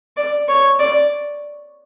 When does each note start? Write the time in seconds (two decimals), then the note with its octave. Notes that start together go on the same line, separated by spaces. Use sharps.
0.17 D5
0.48 C#5
0.79 D5